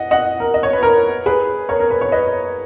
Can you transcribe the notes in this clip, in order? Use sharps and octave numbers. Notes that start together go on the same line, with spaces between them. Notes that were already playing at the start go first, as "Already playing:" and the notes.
Already playing: D#5 F#5
D#5 F#5
A#4
D#5
C#5
B4
A#4
G#4 B4
A#4 C#5
A#4
B4
C#5
B4 D#5